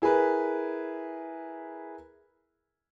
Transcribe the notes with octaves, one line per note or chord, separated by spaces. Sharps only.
E4 G#4 A#4 B4